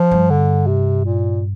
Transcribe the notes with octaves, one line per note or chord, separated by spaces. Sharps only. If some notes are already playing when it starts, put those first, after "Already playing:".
Already playing: F3
G2
D3
C3
A#2